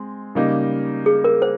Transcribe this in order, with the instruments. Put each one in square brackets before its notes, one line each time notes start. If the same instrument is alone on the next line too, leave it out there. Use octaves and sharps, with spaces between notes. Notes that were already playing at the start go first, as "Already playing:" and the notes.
Already playing: [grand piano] G#3 C4
C#3 G3 A#3 D#4
[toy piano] G#4
A#4
C5